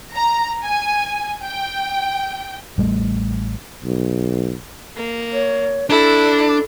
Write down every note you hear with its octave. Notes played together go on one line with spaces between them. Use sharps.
A#5
G#5
G5
A1 G3 A3
B1
A#3
C#5
D4 E4 A4